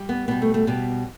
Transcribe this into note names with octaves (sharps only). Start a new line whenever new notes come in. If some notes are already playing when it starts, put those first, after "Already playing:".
Already playing: G3
B3
B2 G3 B3
A3
A3
B2 G3 B3